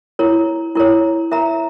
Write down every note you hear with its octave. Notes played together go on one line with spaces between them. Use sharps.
E4 A#4 C#5
E4 A#4 C#5
A#4 E5 A#5